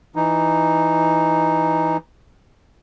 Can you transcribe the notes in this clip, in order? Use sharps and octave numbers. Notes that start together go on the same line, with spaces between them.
E3 D#4